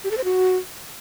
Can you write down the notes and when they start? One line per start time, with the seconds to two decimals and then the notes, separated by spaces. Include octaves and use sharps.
0.04 G4
0.11 A4
0.17 C5
0.24 F#4